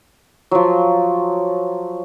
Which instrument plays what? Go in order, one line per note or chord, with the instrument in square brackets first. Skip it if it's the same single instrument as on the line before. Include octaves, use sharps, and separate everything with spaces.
[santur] F3 F#3